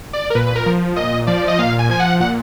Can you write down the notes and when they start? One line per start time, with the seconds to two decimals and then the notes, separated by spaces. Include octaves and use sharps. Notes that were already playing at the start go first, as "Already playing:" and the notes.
0.13 D5
0.30 A#4
0.35 A#2 B4
0.47 B4
0.56 A#4
0.66 F3
0.96 A#2 D#5
1.27 F3 D5
1.48 D#5
1.59 A#2 F5
1.79 G#5
1.89 F3 G#5
2.00 F#5
2.20 A#2 F#5